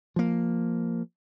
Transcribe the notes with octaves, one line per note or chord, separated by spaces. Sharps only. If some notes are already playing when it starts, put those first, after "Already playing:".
F3 A#3